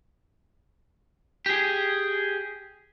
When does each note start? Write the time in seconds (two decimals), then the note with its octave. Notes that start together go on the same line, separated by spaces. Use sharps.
1.46 G4 G#4